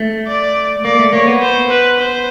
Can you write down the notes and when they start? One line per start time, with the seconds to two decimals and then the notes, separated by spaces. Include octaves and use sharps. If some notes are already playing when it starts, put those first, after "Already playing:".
Already playing: A3
0.27 D5
0.84 A#3 D5
0.99 A3
1.13 A#3 C#5
1.27 B3
1.42 C5
1.70 B4
1.99 C5